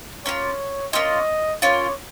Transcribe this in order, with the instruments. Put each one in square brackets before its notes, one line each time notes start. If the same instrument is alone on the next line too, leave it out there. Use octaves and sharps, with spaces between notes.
[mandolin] A#3 C#4 F4 [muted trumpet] C#5
[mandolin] A#3 C#4 F4 [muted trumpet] D#5
[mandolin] A#3 C#4 F4 [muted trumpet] C#5